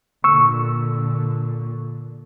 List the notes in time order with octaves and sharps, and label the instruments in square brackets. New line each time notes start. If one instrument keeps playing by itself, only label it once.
[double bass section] A#2 D3 [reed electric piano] C#6 E6